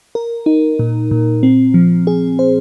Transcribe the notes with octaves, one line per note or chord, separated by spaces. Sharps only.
A#4
D#4
A#2
A#2
C4
F3
G#4
C5